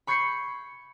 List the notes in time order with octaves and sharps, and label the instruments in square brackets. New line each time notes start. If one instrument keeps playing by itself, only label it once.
[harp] B5 C#6 G6 G#6 C7 C#7